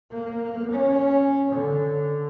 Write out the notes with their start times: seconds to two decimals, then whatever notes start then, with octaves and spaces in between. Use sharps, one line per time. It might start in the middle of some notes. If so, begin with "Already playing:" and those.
0.12 A#3
0.71 C#4
1.52 D3